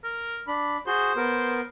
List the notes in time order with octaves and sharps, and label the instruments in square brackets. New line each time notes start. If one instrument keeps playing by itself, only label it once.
[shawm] A#4
[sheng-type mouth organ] D4 [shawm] B5
[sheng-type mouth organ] F#4 G#4 G6 [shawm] C5
[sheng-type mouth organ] B3 A#4